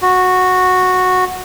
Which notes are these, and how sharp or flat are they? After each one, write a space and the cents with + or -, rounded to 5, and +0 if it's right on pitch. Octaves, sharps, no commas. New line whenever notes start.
F#4 -10